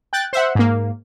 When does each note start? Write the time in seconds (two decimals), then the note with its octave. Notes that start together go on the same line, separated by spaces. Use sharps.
0.13 G5 F#6 A6
0.33 C5 E5 F#5
0.55 G#2 A#3